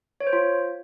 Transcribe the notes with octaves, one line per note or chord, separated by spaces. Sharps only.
C#5
C5
F4